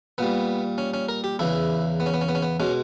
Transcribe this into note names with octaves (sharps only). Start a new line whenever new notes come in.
A#2 G3 B3
C#4
C#4
A#4
G4
E2 C#3 E3 E4
B3
C#4
B3
C#4
B3
C#4
B3
B2 G#3 C#4